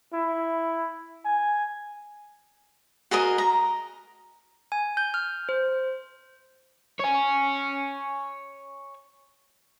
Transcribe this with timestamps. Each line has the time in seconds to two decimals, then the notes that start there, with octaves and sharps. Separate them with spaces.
0.13 E4
1.25 G#5
3.11 F#4 G#4 A#4 D#5
3.38 A#5
4.72 G#5
4.97 G6
5.14 F6
5.49 C5
7.00 C#5 G#5